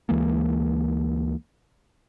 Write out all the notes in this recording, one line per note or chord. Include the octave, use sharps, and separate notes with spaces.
D2 E3 G#3 A#3